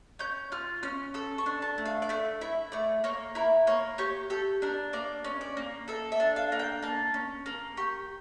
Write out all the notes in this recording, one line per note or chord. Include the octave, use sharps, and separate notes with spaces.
C#4 G6
F4 F6
C#4 F6
A4 E6
C#6
D4
A5
A3
F5
D5
A3 E5
E4 E5
A3 D5
A#3 C#5
E4 A#4
A#3 C#5
G4 C#5
G4 A4
D4 A#4
A#3 D5
C#4
D5
A#3
A4 E5
E5
D4
F5
A#3
G5
A#3 A5
C#4
A#3
G4 C#6